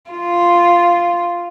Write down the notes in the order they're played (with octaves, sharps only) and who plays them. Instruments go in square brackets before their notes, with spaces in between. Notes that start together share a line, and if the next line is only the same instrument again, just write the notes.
[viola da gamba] F4